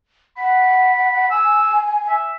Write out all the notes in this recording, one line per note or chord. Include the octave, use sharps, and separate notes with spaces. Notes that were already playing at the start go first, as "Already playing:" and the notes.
F#5 B5
G#5 E6
E5